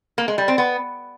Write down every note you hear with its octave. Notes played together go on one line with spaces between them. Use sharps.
A#3
G#3
G3
C4
B3